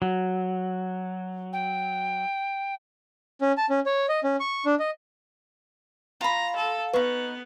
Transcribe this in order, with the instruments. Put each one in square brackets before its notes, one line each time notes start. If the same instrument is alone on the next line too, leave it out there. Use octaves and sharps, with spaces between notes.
[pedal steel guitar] F#3
[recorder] G5
[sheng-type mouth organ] C#4
A5
C#4
C#5
D#5
C#4
C#6
D4
D#5
[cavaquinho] F4 B5 [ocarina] F5 [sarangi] A#5
[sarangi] A4
[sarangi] B3 [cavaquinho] D#4 C#6 [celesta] B4